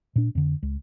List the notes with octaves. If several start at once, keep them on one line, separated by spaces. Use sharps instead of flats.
A#2 D4
F2 D3
C#2